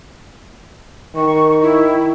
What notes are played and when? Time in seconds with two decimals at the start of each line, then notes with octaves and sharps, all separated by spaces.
1.16 D#3 C#6
1.62 E4